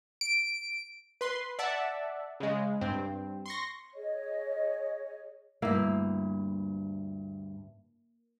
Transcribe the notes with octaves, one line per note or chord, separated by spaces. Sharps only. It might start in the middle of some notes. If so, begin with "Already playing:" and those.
D7
B4 C6
D5 E5 F#5 A5
C#3 G#3
G2 C4
C6 C#6 A#6
G#4 C#5 D#5
D2 G2 A#3 E4